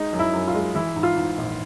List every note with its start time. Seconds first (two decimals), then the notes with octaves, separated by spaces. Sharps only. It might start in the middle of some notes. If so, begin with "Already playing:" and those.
Already playing: G#3 D#4
0.13 F#2
0.19 E4
0.33 F#2
0.48 F4
0.55 G#3
0.75 E3 E4
0.96 G#2
1.03 F4
1.17 G#2
1.38 A#1